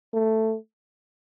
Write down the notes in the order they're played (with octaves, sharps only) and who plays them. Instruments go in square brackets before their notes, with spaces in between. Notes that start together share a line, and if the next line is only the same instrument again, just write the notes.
[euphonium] A3